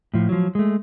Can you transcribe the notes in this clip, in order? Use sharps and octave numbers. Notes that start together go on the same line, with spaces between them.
A2 F3
F3 F#3
G#3 A3